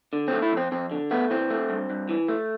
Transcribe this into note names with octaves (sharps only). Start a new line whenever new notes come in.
D3
A3 C4
E4
F2 C4
F2 C4
D3
A3 B3
E3 C4
A3
G2
G2
E3
A3